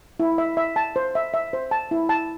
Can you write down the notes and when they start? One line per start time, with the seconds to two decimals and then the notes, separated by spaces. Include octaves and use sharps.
0.20 E4
0.38 E5
0.57 E5
0.76 A5
0.96 C5
1.15 E5
1.34 E5
1.53 C5
1.71 A5
1.91 E4
2.09 A5